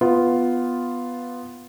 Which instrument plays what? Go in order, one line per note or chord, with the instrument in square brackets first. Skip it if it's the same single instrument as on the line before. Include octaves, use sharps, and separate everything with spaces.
[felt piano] B3 F4